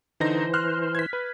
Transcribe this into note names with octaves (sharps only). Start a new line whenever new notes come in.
D3 E3 D#4 C5 A#6
C6 F6 F#6
G#6 B6
B4